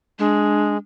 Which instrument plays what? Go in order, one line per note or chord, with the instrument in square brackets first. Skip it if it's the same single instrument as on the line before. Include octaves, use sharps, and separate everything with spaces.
[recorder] G#3 [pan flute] D4